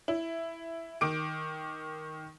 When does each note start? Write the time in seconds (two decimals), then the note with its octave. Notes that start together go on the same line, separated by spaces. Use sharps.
0.08 E4
1.01 D#3 D6 D7